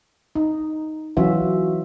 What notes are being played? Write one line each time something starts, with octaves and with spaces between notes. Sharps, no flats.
D#4
E3 F#3 C#4 F4 F#4 E5